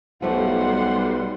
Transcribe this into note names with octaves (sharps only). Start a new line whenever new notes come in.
B1 F3 G3 A3 F#5 C6